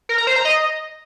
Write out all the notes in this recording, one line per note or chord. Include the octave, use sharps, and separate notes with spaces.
A#4
A#5
C5
A#5
D#5